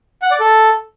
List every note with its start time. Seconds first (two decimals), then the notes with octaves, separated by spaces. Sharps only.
0.22 F#5
0.31 D5
0.40 A4